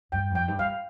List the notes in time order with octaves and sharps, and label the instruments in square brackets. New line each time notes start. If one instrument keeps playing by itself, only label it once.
[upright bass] G2 [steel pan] G5
[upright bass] F2
[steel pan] G5
[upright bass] G2
[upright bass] G2 [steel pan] F5